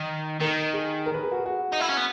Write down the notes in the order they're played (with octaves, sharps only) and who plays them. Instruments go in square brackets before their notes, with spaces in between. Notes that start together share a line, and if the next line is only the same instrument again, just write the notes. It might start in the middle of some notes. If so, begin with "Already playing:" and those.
Already playing: [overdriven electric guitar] D#3
[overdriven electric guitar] D#3 [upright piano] A#4
[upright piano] G#4
A#4
B4
G#4
F#4
G#4
F#4
[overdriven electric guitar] D#4
E4
C#4
B3